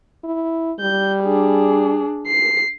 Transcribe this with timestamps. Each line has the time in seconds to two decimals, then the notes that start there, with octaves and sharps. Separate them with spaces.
0.24 E4
0.80 G3 G6
1.24 D4 G#4
2.27 C7